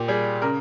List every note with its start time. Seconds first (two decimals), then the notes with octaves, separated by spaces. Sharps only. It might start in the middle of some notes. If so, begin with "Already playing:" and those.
Already playing: A#2 G4
0.08 G3 G#4
0.42 C#3 A#4